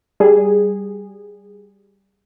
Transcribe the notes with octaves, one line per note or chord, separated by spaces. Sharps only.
G3 G#4